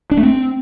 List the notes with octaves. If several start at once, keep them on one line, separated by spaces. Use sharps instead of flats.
D4
A3
C4